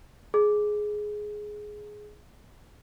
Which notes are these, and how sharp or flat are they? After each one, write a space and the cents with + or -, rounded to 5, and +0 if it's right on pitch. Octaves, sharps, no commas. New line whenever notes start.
G#4 +10